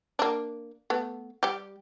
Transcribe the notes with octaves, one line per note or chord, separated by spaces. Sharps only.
A#3 D4
A3 B3
G3 G4